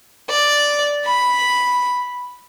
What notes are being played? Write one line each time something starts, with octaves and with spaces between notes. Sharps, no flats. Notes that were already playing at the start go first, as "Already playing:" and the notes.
D5
B5